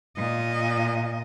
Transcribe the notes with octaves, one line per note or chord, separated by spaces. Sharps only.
A#2 D#5